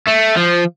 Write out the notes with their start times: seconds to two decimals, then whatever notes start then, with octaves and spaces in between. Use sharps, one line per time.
0.07 A3
0.36 F3